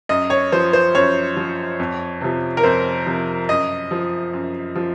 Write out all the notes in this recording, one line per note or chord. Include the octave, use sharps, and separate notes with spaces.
F#2 D#5
C#5
F3 C5
C5
F#2 C#5
F3
F2
C3 F3
A#4
F2 C5
C3 F3
F#2 D#5
F3
F#2
F3